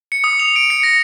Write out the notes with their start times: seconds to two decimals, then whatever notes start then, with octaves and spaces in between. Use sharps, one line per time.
0.12 C#7
0.24 D#6
0.40 F7
0.56 D7
0.70 C#7
0.83 A#6